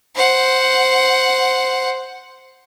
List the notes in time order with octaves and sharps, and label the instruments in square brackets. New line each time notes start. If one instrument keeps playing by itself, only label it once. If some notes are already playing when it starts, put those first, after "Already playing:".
[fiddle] C5 F#5